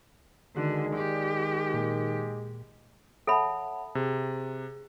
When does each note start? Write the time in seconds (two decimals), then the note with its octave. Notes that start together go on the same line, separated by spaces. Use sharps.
0.57 D3 D#3 G#3 F#4
0.97 G4 D5
1.74 A#2
3.27 A4 C#5 E5 F#5 A5 B5
3.95 C3 G#4